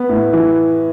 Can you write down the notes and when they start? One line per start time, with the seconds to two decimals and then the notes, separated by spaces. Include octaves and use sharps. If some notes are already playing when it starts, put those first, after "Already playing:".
Already playing: B3
0.09 A2
0.33 E3